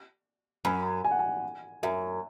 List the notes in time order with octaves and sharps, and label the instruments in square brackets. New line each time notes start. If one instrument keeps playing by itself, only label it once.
[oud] F#2 [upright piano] B5
[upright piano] G#5
F#5
G#5
[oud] F#2 [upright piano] E5